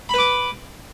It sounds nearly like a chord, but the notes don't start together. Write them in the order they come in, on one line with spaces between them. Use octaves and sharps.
B5 B4 D6